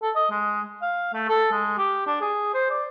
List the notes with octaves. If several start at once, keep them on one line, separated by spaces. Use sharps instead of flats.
A4
D#5
G#3
F5
A3
A4
G#3
G4
D4
G#4
C5
D5